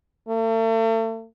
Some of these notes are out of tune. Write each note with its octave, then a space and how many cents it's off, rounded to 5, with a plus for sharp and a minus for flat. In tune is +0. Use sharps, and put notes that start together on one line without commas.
A3 +40